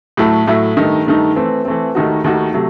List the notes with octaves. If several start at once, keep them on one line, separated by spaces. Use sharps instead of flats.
A2 F#3 A3 E4 A4
A2 F#3 A3 E4 A4
G2 D#3 A3 D#4
G2 D#3 A3 D#4
E3 A3 C4
E3 A3 C4
D#2 D#3 A3 D#4 F#4
D#2 D#3 A3 D#4 F#4
C3 F#3 A3